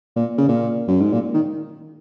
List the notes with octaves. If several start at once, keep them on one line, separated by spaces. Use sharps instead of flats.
A#2
C#3
A#2
F#2
G#2
A#2
D#3